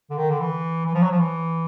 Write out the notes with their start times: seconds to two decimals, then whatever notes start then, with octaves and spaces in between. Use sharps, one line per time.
0.10 D3
0.18 D#3
0.30 D3
0.40 E3
0.86 E3
0.94 F3
1.03 F#3
1.11 F3
1.20 E3